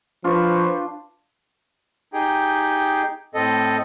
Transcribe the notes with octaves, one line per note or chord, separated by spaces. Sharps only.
F3 D4 F4 B4 C5 C#6
D#4 G4 G#4 G5
A2 C4 A4 D#5